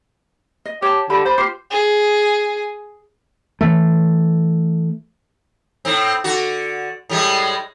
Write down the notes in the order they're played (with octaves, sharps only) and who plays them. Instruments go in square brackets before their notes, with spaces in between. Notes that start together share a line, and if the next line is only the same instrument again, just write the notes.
[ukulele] D#5
[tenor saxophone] G4 [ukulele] C#5 A5
[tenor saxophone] D3 [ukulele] G4 B5
[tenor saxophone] C5 [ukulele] D5 B5
[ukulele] F4 C5 [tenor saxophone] G4
[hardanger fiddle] G#4
[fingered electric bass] E3 A3
[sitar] A2 C4
D3 F#4
A2 G3 G#3